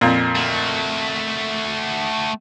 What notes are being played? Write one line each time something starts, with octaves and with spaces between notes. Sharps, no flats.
F2 A#2
A3 F#4